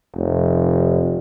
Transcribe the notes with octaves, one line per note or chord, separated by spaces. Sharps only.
F1